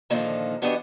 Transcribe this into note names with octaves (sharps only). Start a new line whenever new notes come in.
A#2 D3 D#3 F3 A#3 D#4
E2 B3 D4 F#4 G4 D#5